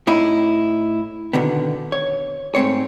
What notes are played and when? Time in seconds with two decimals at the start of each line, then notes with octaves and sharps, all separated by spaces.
0.07 A2 D#4 E4
1.33 B2 D3 D#3 B3
1.92 C#5
2.55 G#2 A3 C4 C#5